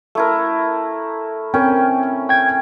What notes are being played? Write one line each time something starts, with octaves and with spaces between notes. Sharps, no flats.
A3 E4 A#4
C4 C#4 A#4 G5
G5 G#6